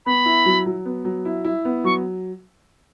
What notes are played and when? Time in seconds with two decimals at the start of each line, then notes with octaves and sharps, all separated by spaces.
0.05 B3 B5
0.25 E4
0.46 F#3
0.66 F#3
0.85 B3
1.05 F#3
1.25 E4
1.45 E4
1.65 B3
1.84 F#3 C#6